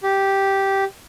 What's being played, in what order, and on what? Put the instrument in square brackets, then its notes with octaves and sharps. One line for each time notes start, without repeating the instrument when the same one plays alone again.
[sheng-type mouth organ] G4